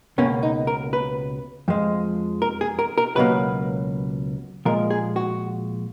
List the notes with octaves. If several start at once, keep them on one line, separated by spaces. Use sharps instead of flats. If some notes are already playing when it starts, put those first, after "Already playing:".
C#2 B2 A#3 C#4
D#4
A#4
B4
F2 F3 G#3
A#4
G#4
A#4
A#4
C#2 B2 F#3 A#3 B4
A#2 F3 G#3 A#4
G#4
F#4